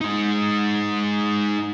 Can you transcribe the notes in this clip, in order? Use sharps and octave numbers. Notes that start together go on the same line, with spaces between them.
G#3 D#4